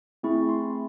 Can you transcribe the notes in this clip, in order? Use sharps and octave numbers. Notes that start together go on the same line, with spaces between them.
A3 C4 E4 G#4 C#6
C6